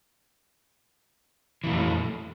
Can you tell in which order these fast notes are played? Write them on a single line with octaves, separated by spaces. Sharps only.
E3 A#2 A3 F2